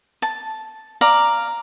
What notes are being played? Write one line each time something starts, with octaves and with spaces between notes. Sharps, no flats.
A5
D5 F5 A#5